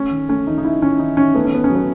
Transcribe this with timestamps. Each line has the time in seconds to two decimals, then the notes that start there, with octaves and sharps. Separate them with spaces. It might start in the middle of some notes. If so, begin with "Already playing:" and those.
Already playing: A3 C#4
0.11 D#3
0.29 A3 C#4
0.47 D#3 D#4
0.58 D#4
0.65 D#3 E4
0.82 D#3 C#4
0.99 D#3 D#4
1.17 D#3 C#4
1.35 A3 B3
1.45 C#4
1.52 D#3 B3
1.64 C#4
1.70 F#3
1.75 B3